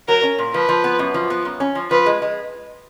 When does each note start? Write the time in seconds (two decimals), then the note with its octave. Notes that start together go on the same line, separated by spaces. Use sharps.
0.08 F#3 A#4
0.23 C#4
0.38 A#2
0.54 F3 B4
0.69 F3
0.84 B3
0.99 F#2
1.14 F3
1.30 B3
1.45 F#2
1.60 C#4
1.75 F3
1.91 F3 B4
2.06 G#3
2.22 G#3